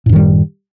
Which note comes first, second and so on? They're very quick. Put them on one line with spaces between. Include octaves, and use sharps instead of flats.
A2 F#2 D#3 G3